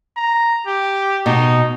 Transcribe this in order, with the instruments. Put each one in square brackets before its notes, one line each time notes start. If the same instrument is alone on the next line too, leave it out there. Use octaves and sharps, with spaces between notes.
[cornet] A#5
G4
[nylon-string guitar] B2 [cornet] D#4